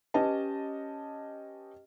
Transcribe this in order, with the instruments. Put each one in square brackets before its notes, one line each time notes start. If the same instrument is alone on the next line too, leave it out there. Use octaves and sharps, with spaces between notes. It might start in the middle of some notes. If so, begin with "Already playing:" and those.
[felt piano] C#4 G4 B4 D#5 A5